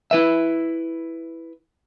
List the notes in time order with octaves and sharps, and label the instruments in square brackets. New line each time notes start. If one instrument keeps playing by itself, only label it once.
[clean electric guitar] E4 B4 E5